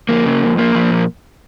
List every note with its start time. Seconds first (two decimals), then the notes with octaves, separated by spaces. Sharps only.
0.09 F2 A#3
0.26 C#3
0.42 F2
0.58 F3 A#3
0.75 F3
0.91 A#2